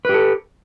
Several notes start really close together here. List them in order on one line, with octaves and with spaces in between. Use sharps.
B4 G4 A4